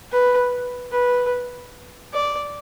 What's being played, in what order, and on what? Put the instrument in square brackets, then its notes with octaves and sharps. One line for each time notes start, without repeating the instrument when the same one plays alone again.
[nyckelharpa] B4
B4
D5